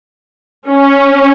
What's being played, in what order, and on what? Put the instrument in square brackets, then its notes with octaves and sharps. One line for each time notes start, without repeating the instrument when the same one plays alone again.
[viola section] C#4